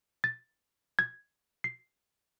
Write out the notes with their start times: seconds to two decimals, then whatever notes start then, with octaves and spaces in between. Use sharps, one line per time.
0.24 A6
0.99 G#6
1.64 C7